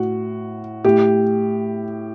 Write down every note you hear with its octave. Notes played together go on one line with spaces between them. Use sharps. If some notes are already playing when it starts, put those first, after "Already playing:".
Already playing: A2 F#4
A2 G4